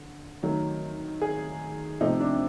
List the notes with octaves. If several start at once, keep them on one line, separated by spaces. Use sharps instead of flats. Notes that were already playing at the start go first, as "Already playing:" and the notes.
Already playing: D3
D#3 F#3 A3
G#4
C3 F3 A3 D#4
D4